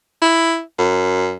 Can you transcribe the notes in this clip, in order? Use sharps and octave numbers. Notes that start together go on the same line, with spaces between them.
E4
F#2